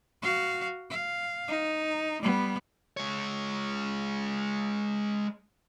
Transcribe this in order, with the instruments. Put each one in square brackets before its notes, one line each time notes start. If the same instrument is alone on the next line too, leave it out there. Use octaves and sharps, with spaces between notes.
[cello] F#4 F5
F5
D#4
G3 B3
[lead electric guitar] G#3 C#5